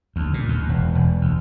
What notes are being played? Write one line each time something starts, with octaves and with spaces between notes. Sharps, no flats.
D2
A#2
D#2
E1
E1
D2